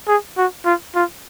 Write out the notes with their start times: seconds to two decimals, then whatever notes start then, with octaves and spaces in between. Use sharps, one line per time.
0.08 G#4
0.37 F#4
0.65 F4
0.95 F4